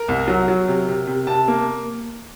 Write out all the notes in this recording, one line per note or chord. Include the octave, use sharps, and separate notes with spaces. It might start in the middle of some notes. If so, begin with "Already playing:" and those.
Already playing: A#4
C2
F#3
F#3
C3
C3
C3
C3 A5
A#3